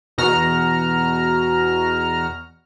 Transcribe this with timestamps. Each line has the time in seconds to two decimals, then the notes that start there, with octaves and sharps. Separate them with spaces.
0.18 E2 B2 F#4 A#5 F6